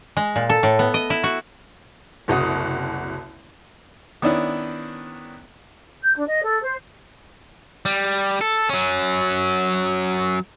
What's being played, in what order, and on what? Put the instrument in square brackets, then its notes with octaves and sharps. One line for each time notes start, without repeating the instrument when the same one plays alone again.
[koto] G#3
A#2
A4
A2
B3
D#5
E4
F#4
[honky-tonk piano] F#1 C2 F#4 D#6
[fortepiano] D#3 B3 C#4 D4 E4
[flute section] G6
D4
D#5
A4
C5
[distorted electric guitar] G3
A4
F#3 C#4